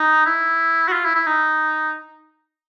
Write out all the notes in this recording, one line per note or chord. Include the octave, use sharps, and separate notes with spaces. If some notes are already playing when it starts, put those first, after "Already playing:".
Already playing: D#4
E4
F#4
F4
E4
E4
D#4